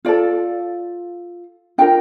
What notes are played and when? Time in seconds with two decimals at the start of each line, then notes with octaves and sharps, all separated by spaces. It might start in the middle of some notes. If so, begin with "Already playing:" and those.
0.05 F4 A4 D5
1.78 D4 F4 A#4 G5